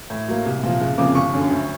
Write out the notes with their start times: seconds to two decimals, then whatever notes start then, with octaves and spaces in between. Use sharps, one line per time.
0.10 A2
0.28 F#3 A#3
0.46 C2
0.63 A#2 F3
0.80 F#1
0.98 F2 C#3 F3 A#3 D6
1.15 G1 C#6
1.33 F#2 D3
1.50 D2